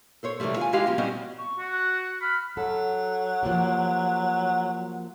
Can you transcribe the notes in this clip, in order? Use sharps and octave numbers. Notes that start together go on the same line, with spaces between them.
A4 C5 C#5
C3 E3 F3 G3 A3
F4 G#5
G#3 E4 F4 G4 D#5 F5
F3 A#3 C#4 F4
G3 C4 C#4 F#4 D#5
C#6
F#4
F#6
B5 F6
F#3 A4
F3 A#3 G4